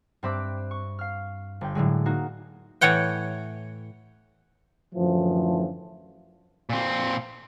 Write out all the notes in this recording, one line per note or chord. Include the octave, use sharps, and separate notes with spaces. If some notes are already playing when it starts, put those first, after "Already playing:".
G2 C4 E5 B5 D6 F#6
C#6
F5 F6
G1 G5
A2 D3 F#3 G#3
A#3 D#4 F#4
A2 E3 C#5 F#5 G5
F#2 A2 D3 E3 F3
A#2 C4